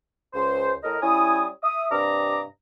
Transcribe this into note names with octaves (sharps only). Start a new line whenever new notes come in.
C#2 C5
A2 A#4 D#5
G3 C#4 E4 G#5 D#6
E5 D#6
G2 C3 D4 D#5 A#5 D6